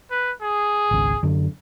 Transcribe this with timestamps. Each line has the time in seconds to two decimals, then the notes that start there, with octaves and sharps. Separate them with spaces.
0.11 B4
0.41 G#4
0.91 G#1 C#2
1.23 F#2 D3